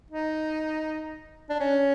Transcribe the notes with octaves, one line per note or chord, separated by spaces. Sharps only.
D#4
D4
C#4